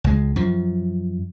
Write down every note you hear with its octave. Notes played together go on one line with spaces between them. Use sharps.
C#2 G#3
F#2 F3